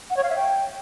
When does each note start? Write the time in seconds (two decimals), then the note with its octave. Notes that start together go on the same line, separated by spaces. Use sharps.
0.10 F#5
0.17 C#5
0.23 F5
0.30 E5
0.36 G5